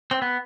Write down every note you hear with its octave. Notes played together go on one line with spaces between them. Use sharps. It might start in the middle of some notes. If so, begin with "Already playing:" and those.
C4
B3